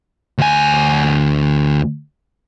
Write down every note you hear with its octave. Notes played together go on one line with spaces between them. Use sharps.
D2 G#5